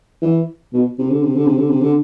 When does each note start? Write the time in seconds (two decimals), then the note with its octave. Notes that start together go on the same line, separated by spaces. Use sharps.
0.22 E3
0.73 B2
0.98 C3
1.10 D3
1.23 C3
1.35 D3
1.46 C3
1.57 D3
1.69 C3
1.81 D3